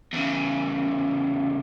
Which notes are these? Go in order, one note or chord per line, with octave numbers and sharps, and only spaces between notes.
E2 C#3